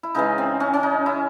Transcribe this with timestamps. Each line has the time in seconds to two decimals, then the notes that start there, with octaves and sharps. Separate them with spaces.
0.03 E4
0.15 C#3 E3 G#3 D#4
0.38 C4
0.60 C#4
0.73 C#4
0.83 D#4
1.06 E4